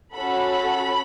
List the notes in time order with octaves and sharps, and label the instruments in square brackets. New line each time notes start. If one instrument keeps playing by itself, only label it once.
[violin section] C#4 F#4 A4 B5